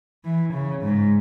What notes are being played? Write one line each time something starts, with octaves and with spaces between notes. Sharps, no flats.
E3
C#3
G#2